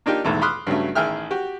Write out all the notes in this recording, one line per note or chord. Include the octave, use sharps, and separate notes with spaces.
A#3 D4 D#4 F4 G4
B1 E2 G#2 D#3 E3 A3
B5 C6 D6 D#6 F6 F#6
G2 C#3 F#3 A3
A1 D#3 G#4 E5 G5 F6
F#4 G4